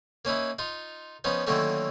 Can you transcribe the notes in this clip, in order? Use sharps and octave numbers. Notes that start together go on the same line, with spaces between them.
A#3 C#4 D#4 E4
D#4 F4
F3 B3 C#4 D#4
D3 D#3 F#3 A3 A#3 C#4